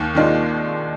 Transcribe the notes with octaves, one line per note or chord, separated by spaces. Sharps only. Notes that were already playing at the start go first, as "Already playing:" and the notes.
Already playing: D#2 F6
D#3 G#3 D4 F4